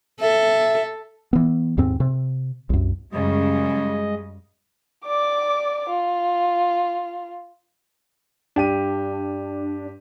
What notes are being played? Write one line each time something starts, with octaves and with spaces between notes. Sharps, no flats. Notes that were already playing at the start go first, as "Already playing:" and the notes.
A4 E5
E3 B3
D#2 G#2 C4
C3
C2 F#2
F#2 C#3 G3 G#3 D#5
D5 D6
F4
G2 D4 G4 D#7